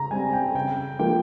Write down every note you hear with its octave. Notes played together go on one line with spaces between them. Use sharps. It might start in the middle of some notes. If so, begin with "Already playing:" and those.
Already playing: C#3 A#5
G3 C4 G#5
G5
C#3 G5
F3 A#3 G5